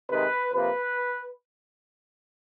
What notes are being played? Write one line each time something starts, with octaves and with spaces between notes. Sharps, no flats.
C3 D#3 G#3 B4
C3 F3 A#3 B4